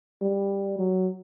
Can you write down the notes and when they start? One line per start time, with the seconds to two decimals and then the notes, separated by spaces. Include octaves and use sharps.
0.22 G3
0.78 F#3